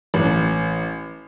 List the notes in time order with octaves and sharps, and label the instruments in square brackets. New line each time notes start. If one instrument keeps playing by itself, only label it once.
[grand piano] A1